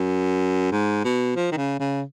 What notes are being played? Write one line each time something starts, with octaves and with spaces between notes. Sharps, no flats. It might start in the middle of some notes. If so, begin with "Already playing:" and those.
Already playing: F#2
G#2
B2
F3
D#3
C#3
C#3